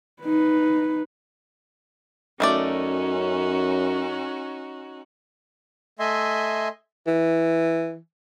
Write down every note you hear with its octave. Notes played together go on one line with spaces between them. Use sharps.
D#4 B4
F#2 D#3 A3 C#4 D#4 F#4 D5
A3 D#5 E5 G#5 C6
E3